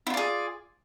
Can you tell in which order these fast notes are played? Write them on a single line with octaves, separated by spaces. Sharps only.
E4 F4 D5 G#4